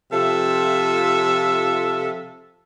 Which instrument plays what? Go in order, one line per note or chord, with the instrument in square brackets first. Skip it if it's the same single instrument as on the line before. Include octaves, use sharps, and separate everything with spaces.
[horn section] C3 F3 F4 A4 E5